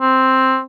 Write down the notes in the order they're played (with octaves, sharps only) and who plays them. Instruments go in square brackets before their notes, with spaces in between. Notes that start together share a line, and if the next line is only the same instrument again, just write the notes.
[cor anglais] C4